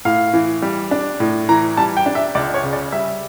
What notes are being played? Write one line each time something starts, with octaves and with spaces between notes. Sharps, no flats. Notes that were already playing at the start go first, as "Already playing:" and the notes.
A2 F5
E3
G3
D4
A2
E3 A#5
G3 A5
G5
D4
E5
C#2 D5
C#5
C#3
D5
G3 E5